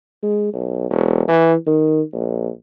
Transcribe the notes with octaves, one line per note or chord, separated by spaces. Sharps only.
G#3
B1
E1
E3
D#3
A#1